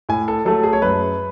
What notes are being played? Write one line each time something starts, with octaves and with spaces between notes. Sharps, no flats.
A2 G#5
A4
F#3 A3 A4
G#4
C#5
F#2 B4